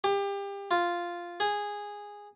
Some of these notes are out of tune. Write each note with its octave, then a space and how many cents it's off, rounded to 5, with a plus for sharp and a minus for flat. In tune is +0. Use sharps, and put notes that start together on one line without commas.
G4 +30
F4 -5
G#4 -10